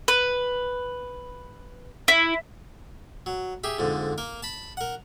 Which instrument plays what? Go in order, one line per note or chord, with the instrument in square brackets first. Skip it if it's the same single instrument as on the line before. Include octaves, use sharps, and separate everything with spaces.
[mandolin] B4
E4
[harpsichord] F#3
G4 G#4 E5
F2 G#2 D3
A#3 A#4
A5 B5
A#4 F#5